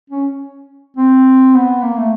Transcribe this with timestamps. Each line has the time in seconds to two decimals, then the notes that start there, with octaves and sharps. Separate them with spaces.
0.10 C#4
0.97 C4
1.55 B3
1.83 A#3
1.97 A3